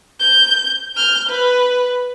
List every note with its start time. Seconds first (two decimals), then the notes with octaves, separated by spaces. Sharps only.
0.20 G6
0.95 F6 G6
1.29 B4